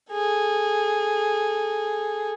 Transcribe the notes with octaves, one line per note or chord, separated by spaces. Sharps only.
G#4 A4